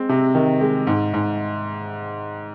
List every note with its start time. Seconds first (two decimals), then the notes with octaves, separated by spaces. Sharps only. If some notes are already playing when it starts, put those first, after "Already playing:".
Already playing: G#3 C4
0.09 C3
0.35 D#3
0.61 G#3
0.87 G#2
1.13 G#2